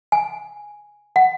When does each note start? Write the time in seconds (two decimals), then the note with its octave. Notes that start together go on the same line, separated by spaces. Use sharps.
0.12 G#5
1.16 F#5